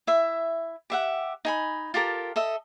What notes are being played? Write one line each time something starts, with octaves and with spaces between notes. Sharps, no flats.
E4 E5
G4 E5 F#5
D#4 G#5 B5
F4 G4 A4 A#4
A4 D#5 E5